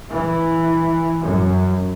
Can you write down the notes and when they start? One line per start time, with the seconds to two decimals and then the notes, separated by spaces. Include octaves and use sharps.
0.11 E3
1.21 F#2